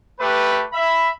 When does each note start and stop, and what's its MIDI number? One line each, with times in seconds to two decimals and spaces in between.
0.20 0.64 57
0.20 0.64 67
0.20 0.64 71
0.73 1.08 76
0.73 1.08 83